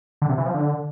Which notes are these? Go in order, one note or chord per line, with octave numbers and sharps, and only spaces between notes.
D3
C3
E3
F3
D3